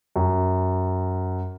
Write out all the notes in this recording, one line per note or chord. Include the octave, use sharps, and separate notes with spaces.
F#2